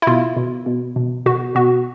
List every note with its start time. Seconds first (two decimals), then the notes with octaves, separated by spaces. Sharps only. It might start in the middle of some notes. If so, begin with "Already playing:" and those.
0.02 E4
0.07 B2 F4
0.37 B2
0.66 B2
0.96 B2
1.26 B2 F#4
1.55 B2 F#4